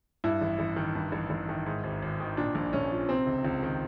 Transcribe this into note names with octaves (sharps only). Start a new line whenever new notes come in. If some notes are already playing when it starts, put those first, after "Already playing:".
G2 E4
A1
A1
D#3
G2
A1
A1
D#3
G#2
G#1
G#1
D#3
A#2 D4
A#1
A#1 C#4
F3
C3 C4
C#2
C#2
D#3